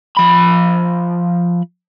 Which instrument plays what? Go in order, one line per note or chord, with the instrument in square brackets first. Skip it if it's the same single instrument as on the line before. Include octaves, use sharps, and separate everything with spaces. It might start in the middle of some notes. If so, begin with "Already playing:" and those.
[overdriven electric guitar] F3 B5